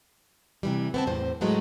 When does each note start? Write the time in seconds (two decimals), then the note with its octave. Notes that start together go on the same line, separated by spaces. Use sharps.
0.63 C3 E3 G3
0.94 B3 C4 A5
1.07 E2 A2 C5
1.41 A2 F#3 G#3 A3 B3